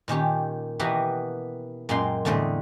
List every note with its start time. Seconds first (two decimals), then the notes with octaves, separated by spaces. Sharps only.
0.08 A#2 D#3 C#4 G4
0.79 B2 E3 B3 F#4 G4 A#4
1.89 F#2 A#2 G#3 F4 G5 C6
2.25 E2 A2 D3 G3 C4 D#5